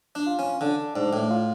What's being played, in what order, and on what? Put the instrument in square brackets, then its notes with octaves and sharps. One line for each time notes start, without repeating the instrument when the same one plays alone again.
[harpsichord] D4
[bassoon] F4
[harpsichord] C#4
[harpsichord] D3 [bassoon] D4
[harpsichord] G#2 [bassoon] D4
[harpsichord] A2
[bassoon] F4